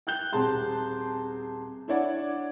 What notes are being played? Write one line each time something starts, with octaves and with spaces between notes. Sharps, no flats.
G5 F#6 G6 G7
D#1 C4 G#4 A5 C6
D4 E4 C#5 D5 F#5